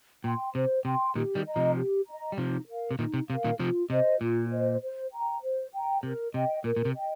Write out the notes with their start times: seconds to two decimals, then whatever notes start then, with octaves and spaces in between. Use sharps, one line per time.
0.24 A#2 G5 C6
0.54 C3 C5
0.85 C3 G5 C6
1.15 A#2 D#3 G4
1.35 D#3 G3
1.46 D#5 A#5
1.56 C3 F3
1.76 G4
2.07 D#5 A#5
2.32 G3
2.37 C3 F3 D#4
2.68 A#4 F5
2.91 C3
2.99 A#2 D#3 D#4
3.14 C3
3.28 C3 F5
3.33 A#4
3.44 A#2 D#3
3.59 C3 F3 F4
3.90 C3 C5 D#5
4.21 A#2 F4
4.51 C5 D#5
4.82 C5
5.12 G5 A#5
5.43 C5
5.74 G5 A#5
6.03 C3 A#4
6.34 C3 D#5 G5
6.64 A#2 A#4
6.76 A#2
6.85 C3
6.95 D#5 G5